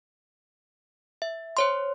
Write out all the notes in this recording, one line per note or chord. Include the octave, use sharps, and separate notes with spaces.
E5
C5 C#5 C6